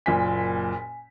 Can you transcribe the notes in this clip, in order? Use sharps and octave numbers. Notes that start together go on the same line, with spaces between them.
F#1 A#2 G#5 B6